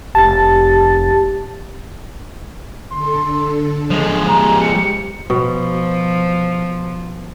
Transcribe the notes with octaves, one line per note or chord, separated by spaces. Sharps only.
F1 G4 A5 A6
D3 A4 C6
F3 F#3 G#3
G4 A#5
C#7
B2 F3